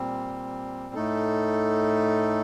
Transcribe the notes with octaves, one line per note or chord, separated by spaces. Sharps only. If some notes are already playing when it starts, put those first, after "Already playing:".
Already playing: A#2 G3 C4
A2 A3 D#4 A4